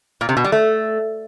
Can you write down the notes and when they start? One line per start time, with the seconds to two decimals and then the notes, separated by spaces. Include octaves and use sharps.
0.21 A#2
0.29 C3
0.37 B2
0.44 G3
0.52 A3